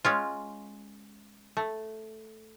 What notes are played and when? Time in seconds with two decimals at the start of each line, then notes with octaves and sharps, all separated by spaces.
0.05 G#3 C#4 F4
1.57 A3